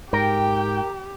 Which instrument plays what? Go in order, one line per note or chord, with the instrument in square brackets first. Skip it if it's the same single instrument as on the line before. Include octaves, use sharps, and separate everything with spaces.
[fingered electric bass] G#2 [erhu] G4 [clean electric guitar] A#4 [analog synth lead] G5